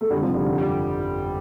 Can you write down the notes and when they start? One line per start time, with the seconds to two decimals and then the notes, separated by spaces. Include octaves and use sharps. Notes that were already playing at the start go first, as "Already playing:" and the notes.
0.01 A3
0.10 F2 D3 G3
0.22 C3 F3
0.34 G1 D3 G3
0.46 D3
0.57 D3 G3